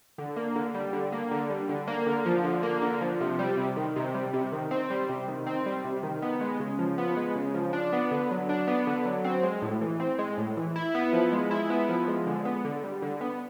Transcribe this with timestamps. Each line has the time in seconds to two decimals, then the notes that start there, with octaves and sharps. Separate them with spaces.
0.18 D3
0.36 A#3
0.55 D3
0.74 G3
0.93 D3
1.12 A#3
1.31 D3
1.50 G3
1.69 D3
1.87 A#3
2.06 D3
2.26 F3
2.44 D3
2.63 A#3
2.82 D3
3.01 F3
3.21 C3
3.39 G3
3.57 C3
3.76 D#3
3.96 C3
4.14 G3
4.33 C3
4.52 D#3
4.71 C4
4.90 G3
5.09 C3
5.28 D#3
5.46 C4
5.66 G3
5.84 C3
6.03 D#3
6.22 B3
6.41 G#3
6.60 C#3
6.79 F3
6.98 B3
7.17 G#3
7.35 C#3
7.54 F3
7.73 D4
7.93 B3
8.11 D3
8.31 F#3
8.49 D4
8.67 B3
8.87 D3
9.05 F#3
9.24 C4
9.43 G#3
9.62 A2
9.81 E3
10.00 C4
10.18 G#3
10.38 A2
10.57 E3
10.76 E4
10.95 B3
11.13 F3
11.32 G#3
11.51 E4
11.70 B3
11.89 F3
12.08 G#3
12.26 D3
12.45 B3
12.65 D3
12.84 G3
13.02 D3
13.21 B3